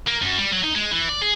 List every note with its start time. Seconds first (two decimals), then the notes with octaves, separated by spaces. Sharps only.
0.07 A#3
0.22 F#2
0.38 G3
0.52 F#3
0.64 D#4
0.75 G#3
0.91 E3
1.09 D5
1.21 G#4